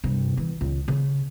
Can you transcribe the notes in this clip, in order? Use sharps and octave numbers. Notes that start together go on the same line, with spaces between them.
G2 C3
E3
C#2
C#3